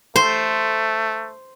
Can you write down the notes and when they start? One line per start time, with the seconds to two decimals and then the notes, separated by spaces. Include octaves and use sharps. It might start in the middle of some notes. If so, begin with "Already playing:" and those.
0.16 A3 C5